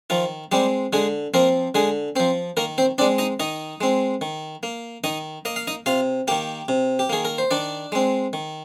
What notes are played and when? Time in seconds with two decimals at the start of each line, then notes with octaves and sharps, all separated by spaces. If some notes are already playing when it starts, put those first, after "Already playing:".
0.10 D#3 F3 F4
0.52 G3 G#3 C4 G4
0.93 D3 G#3 G#4
1.34 F3 A#3 C4 A#4
1.75 D3 G#3 G#4
2.16 F3 C4 C5
2.57 D#3 A#3 A#4
2.78 C4 C5
2.98 C4 D4 D5
3.01 G#3
3.18 D#4 D#5
3.40 D#3 D#4 D#5
3.81 G#3 C4
4.21 D#3
4.63 A#3
5.04 D#3 D#4 D#5
5.45 A#3 D#5
5.56 F5
5.67 D#4 D#5
5.86 C3 F4 F5
6.28 D#3 A#3 G4 G5
6.68 C3
6.99 G4
7.10 D#3 A#3 G#4
7.25 A#4
7.38 C5
7.51 D#3 D4 D5
7.92 G#3 C4
8.33 D#3